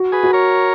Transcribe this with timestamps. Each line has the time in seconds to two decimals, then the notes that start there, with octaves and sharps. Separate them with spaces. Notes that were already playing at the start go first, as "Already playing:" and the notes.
Already playing: F#4
0.12 G#4 B4
0.23 F#4
0.33 A#4 C#5